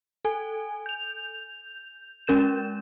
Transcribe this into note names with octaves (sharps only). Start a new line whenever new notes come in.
A4 G#5
G6 F7
G#3 C#4 A#4 G6 E7